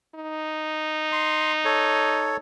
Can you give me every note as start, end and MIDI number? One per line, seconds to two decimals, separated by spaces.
0.15 2.40 63
1.12 1.52 84
1.65 2.37 69
1.65 2.37 73